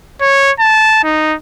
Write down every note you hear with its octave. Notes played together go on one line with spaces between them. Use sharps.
C#5
A5
D#4